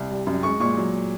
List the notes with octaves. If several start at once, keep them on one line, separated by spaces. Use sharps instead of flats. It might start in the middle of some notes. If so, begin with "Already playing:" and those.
Already playing: C2
G3
F#2
G#3 C#6
A#2 C#6
F#3